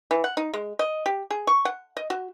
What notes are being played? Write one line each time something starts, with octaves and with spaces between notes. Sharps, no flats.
E3
F#5
D#4
G#3
D#5
G4
G#4
C#6
F#5
D#5
F#4